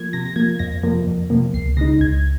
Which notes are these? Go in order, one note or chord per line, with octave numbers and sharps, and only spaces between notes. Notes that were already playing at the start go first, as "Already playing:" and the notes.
Already playing: F3 A#3 G#6
C3 A#6
A#6
F3 A#3 G#6
F2 A#6
C3 F3 A#3
F2
C3 F3 A#3
C#2 C7
C#3 G#3 D#4 A#6
C#2 G#6